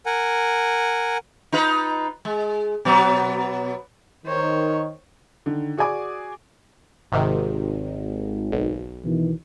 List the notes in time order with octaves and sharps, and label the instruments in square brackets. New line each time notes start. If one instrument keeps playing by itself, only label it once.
[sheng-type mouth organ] A#4 F#5 G#5
[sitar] D#4 F4 B4
G#3
B2 F#3 B3
[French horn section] D#3 [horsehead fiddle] C5 C#5
[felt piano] D3 D#3
F#4 G#4 D5 G#5 D6
[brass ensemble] G#1 [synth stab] G#2 C3 D#3
[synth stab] B1
[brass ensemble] B2 D#3 E3